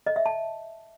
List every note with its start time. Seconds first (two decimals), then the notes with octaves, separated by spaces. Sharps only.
0.07 D#5
0.16 E5
0.26 A5